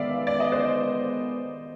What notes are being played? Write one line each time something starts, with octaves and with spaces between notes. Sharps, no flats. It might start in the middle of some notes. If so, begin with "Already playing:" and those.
Already playing: D#3 G#3 B3 D5 E5 F5
D5
D#5
C5 D5